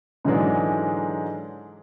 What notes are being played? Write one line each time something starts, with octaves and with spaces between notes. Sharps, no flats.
G#2 D3 E3 F#3 G#3 D4